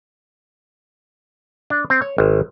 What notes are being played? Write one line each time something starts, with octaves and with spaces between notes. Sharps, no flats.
D4
C4
C#5
G#1